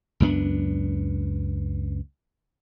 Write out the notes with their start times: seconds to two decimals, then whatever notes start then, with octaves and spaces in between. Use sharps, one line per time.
0.20 C#2 F#2 B3 D4